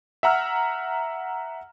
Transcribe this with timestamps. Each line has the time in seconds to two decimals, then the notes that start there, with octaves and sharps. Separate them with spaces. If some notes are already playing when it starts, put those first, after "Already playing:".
0.23 E5 F#5 A#5 E6 F6